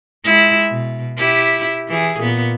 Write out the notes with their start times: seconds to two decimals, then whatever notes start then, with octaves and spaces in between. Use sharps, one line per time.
0.25 G#3 E4
0.71 B2
1.17 E4 G4
1.88 E3 G#4
2.20 A#2 B3